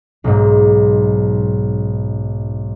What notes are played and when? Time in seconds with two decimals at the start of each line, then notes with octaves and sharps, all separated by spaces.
0.24 B1 G#2